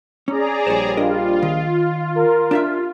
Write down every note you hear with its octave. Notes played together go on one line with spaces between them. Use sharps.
C#4 G#4 D5 A#5
A#1 G3 C5 C#5
D4 F4 A#4 D#5
D#3
A#4
D4 G4 E5